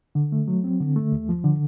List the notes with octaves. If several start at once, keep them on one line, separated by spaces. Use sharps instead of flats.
D3
A3
F#3
C4
D3
A3
D#2
F3
D3